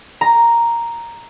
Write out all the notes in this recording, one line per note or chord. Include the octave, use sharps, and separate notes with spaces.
A#5